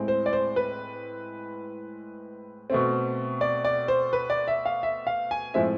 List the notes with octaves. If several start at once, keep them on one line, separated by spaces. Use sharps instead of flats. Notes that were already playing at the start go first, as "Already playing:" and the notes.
Already playing: A2 G#3 C4
C5
D5
C5
B4
B2 A3 C4
D5
D5
C5
B4
D5
E5
F5
E5
F5
G#5
A2 F3 G#3 C4 E5